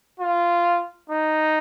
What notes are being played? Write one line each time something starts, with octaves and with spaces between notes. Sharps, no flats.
F4
D#4